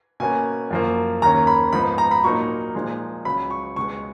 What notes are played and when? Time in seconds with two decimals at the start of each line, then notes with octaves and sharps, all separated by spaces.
0.20 B2 A#3 C#4 G#5
0.71 F#2 F3 A#3
1.22 D#2 D#3 A#3 C#4 A#5
1.47 B5
1.73 G#2 F3 B3 D#4 B5
1.98 A#5
2.11 B5
2.24 A#2 F#3 A#3 D#4 C#6
2.75 A#2 F3 G#3 D#4
3.25 C#2 C#3 F#3 B5
3.50 C#6
3.76 C#2 B2 G#3 C#6